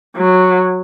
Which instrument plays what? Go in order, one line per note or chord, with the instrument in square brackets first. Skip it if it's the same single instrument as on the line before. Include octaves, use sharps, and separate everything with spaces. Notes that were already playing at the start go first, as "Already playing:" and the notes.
[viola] F#3